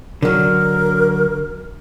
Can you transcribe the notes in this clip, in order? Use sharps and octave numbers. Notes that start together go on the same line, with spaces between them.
D3 F#3 A#4